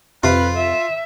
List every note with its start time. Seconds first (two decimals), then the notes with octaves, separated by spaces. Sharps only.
0.24 F2 C3 F4 B4
0.57 E5